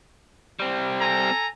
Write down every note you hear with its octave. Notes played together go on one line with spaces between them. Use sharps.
G3 C4
A4 G#5 A#5